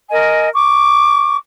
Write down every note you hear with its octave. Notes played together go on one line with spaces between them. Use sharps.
A#4 D#5 G#5
C#6 D6